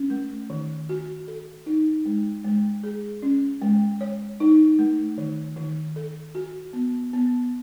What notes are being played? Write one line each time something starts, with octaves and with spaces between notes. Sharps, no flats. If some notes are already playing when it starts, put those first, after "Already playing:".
Already playing: C#4
A3
D#3
F#4
A4
D#4
G#3
G#3
G#4
C#4
G#3
C#5
D#4
A3
D#3
D#3
A4
F#4
B3
B3